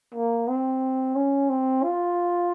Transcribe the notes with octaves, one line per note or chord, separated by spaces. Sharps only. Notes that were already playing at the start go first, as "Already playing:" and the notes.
A#3
C4
C#4
C4
F4